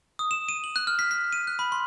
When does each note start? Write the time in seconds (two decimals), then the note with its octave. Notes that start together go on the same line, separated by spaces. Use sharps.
0.19 D#6
0.31 E7
0.49 D#7
0.64 F#7
0.76 F#6
0.87 F6
0.99 B6
1.11 B6
1.33 D#7
1.47 F#6
1.59 B5
1.72 C6